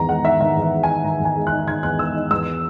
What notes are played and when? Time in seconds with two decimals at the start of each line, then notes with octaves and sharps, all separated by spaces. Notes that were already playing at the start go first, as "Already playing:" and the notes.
Already playing: E2 D#3 A#5
0.09 G#3 F#5
0.25 D#4 E5
0.40 D#3 E5
0.56 E2
0.62 E5
0.72 G#3
0.83 D#4 G#5
1.04 D#3 A#5
1.20 E2
1.25 G#5
1.36 G#3
1.47 F#6
1.52 D#4
1.67 D#3 G#6
1.83 E2 F#6
1.99 G#3 E6
2.15 D#4
2.30 E2 E6